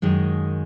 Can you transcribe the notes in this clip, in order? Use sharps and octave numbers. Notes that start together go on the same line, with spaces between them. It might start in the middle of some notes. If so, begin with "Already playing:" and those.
F#2 D#3 G#3